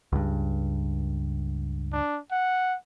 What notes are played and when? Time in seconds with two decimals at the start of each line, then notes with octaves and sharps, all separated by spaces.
0.12 C#2 G2
1.93 D4
2.31 F#5